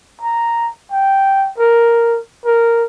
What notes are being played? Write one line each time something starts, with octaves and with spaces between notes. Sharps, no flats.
A#5
G5
A#4
A#4